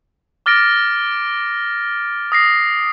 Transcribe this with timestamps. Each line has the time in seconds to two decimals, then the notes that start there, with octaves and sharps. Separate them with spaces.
0.46 D6 F6 A6 A#6 D7
2.32 D#6 A#6 C7